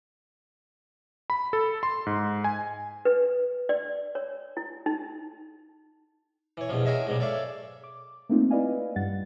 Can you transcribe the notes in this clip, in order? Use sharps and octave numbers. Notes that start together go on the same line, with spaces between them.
B5
A4
C6
G#2
G#5
B4
D5
C#5
E4
D#4
E3 C#5
E2 G2 B2 F3
F#4 G#4 A#4 C#5 D#5 E5
G#2 B2 F#3 G3
A4 C#5 D5 E5 F5
D6
A3 A#3 C4 D#4 F4
E4 B4 D5 D#5 F5 G#5
G2 G3 F#5 A6